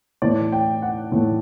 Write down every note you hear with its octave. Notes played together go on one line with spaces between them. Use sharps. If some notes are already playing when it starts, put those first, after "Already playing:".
A2 E3 A3 D5
G5
F#5
A2 E3 A3